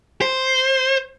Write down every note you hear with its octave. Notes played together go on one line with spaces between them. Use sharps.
C5